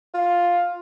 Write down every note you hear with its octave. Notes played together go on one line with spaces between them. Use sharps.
F4